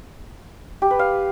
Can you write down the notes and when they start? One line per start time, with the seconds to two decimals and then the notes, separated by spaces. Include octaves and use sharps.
0.82 G4
0.91 B4
0.99 F5